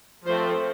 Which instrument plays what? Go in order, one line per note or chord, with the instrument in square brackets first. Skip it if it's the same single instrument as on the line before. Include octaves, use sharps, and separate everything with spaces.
[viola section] F3 A3 C4 C5